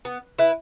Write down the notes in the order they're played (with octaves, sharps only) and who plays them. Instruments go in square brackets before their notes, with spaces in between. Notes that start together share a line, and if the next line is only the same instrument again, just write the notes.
[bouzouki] B3
E4 B4